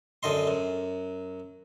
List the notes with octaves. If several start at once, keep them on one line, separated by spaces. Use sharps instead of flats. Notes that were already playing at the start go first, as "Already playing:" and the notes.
F#2 D3 D#5 C6
F#2